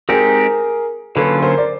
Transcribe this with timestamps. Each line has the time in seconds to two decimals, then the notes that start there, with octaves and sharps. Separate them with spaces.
0.09 G#3 C4 D#4 G4 G#4 A#4
1.16 D3 F#3 A#3 C#4 F4 A4 B4
1.42 A#4 C5
1.58 D5